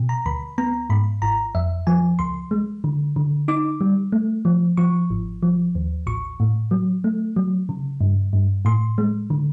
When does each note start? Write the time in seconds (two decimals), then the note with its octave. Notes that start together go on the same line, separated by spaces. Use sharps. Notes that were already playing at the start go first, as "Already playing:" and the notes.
Already playing: B2
0.09 A#5
0.26 D2 B5
0.58 B3 A#5
0.90 G#2 B5
1.22 G#1 A#5
1.55 F2 E5
1.87 F3 G#5
2.19 C#2 C6
2.51 G#3
2.84 D3
3.16 D3
3.48 D#4 D6
3.81 G3
4.12 A3
4.45 F3
4.77 F3 C#6
5.10 G#1
5.43 F3
5.75 D#2
6.07 A1 C#6
6.40 A2
6.71 F#3
7.04 A3
7.36 F#3
7.69 C#3
8.01 G2
8.33 G2
8.65 A2 C6
8.98 G#3
9.30 D3